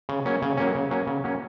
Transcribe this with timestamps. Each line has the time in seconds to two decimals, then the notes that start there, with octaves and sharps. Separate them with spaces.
0.09 C#3
0.25 F#3 A#3 C#4
0.42 C#3
0.57 F#3 A#3 C#4
0.75 C#3
0.91 F#3 A#3 C#4
1.07 C#3
1.24 F#3 A#3 C#4